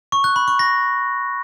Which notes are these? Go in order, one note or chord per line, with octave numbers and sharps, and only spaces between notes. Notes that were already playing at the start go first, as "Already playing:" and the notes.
C#6
F#6
B5
C#6
A#6